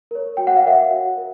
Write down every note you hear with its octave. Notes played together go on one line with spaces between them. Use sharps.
A#4 C#5
F#4 G5
F#5
F5
A#4 C#5 E5 F#5
F#4
A#4